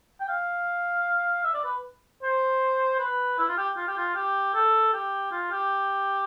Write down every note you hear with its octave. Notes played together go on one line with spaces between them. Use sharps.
G5
F5
E5
D5
B4
C5
B4
E4
F4
G4
F4
G4
F4
G4
A4
G4
F4
G4